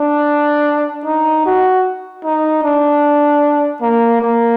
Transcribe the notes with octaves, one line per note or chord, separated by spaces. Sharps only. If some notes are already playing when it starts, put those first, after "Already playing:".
Already playing: D4
D#4
F#4
D#4
D4
A#3
A#3